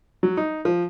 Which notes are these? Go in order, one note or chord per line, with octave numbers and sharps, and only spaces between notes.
F#3
D#4
F3